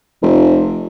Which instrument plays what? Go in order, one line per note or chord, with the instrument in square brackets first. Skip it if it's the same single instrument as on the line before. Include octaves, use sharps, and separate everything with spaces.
[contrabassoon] F1